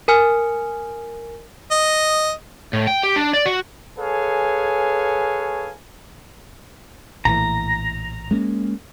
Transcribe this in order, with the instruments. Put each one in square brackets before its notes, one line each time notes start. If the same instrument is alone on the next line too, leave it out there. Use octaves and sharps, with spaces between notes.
[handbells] A#4 G#5 F6
[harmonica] D#5
[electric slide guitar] A2
G5
G4
D4
D5
F#4
[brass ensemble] G#4 A4 B4 C#5 F5 G#5
[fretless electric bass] A#1 A2 E3 [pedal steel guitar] A#5
[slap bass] G#3 A#3 C#4